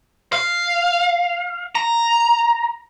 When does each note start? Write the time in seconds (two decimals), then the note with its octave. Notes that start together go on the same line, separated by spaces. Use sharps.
0.33 F5
1.75 A#5